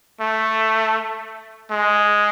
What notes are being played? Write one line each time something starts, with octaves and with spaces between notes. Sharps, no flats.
A3
G#3